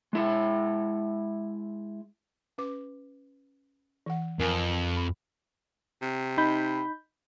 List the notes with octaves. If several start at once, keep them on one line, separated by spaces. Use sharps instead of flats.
G#3 E4 E5
C#4 B4 D6
E3 F#5
F2 A#4 G#5
B5
C3
D#4 B5 G6